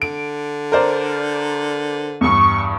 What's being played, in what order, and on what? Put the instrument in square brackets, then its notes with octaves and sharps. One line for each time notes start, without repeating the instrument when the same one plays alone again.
[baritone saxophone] D3 [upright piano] D7
[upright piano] A#4 C5 D5
[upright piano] E2 G2 [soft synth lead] C#6